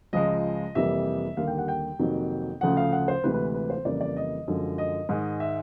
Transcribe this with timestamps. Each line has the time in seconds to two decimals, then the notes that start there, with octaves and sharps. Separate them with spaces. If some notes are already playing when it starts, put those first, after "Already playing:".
0.13 C#2 C#3 F3 G#3 D#5
0.75 F2 C3 E3 G3 A#3 E5
1.37 D#2 D3 G3 A#3 F5
1.47 G5
1.58 F#5
1.68 G5
1.99 F2 C3 D#3 F#3 A#3
2.61 D2 C#3 F3 A3 F#5
2.77 F5
2.92 F#5
3.08 C5
3.23 D2 C3 E3 G#3 B4
3.34 B4
3.54 B4
3.70 C5
3.85 F2 C#3 E3 G3 A#3 D5
4.01 D5
4.16 D#5
4.48 F#2 D3 F3 G#3
4.78 D#5
5.09 G#2 D#3 G#3
5.40 E5